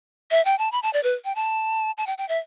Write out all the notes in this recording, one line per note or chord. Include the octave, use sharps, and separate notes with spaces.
E5
G5
A5
B5
A5
D5
B4
G5
A5
A5
G5
G5
E5